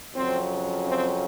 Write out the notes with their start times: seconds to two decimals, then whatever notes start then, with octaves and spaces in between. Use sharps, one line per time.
0.15 F2 C#3 F#3 C4
0.85 C4